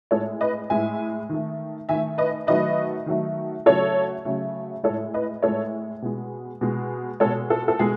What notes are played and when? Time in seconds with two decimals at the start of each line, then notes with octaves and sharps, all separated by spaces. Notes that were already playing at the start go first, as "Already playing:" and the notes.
0.11 A2 G#3 A4 C#5
0.41 B4 D#5
0.70 A2 G#3 E5 G#5
1.29 D#3 A3
1.89 D#3 A3 E5 G#5
2.18 B4 D#5
2.47 D#3 F#3 A3 B4 D#5
3.06 D#3 F#3 A3
3.66 C#3 F#3 A3 A4 C#5
4.25 C#3 F#3 A3
4.83 A2 G#3 A4 C#5
5.14 B4 D#5
5.43 A2 G#3 A4 C#5
6.02 B2 G#3
6.61 B2 G#3
7.20 G#3 A4 C#5
7.25 B2
7.50 A4
7.68 A4
7.79 B2 G#3 G#4